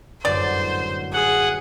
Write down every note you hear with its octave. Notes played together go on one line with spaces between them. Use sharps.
G1 F#2 A2 C5 D5
G#4 F#5